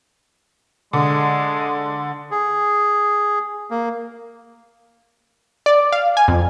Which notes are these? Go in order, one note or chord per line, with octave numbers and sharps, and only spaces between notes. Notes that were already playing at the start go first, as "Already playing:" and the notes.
D3 G#3
G#4
A#3
D5
F5
G#5
F2